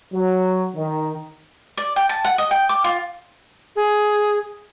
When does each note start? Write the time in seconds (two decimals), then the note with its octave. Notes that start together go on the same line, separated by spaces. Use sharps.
0.13 F#3
0.75 D#3
1.77 D5
1.96 G5
2.09 A5
2.24 F#5
2.38 D#5
2.51 G5
2.69 D6
2.84 F4
3.76 G#4